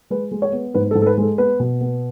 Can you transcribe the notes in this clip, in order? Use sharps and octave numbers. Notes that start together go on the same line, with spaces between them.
G#3 B4
G#3
C#5
B3
G#2 B4
A4
G#2
A4
B4
G#3 A4
B3 B4
B2
B3